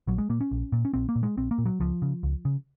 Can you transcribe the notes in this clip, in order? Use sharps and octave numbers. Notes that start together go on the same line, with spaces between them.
A#1 F#3
G#3
A#2 A#3
C#4
A#1
A#2
C#4
A#1 C4
A#3
A#2
G#3
A#1 C4
A#3
A#2
F#3
C#2 F3
C#3
C#2
C#3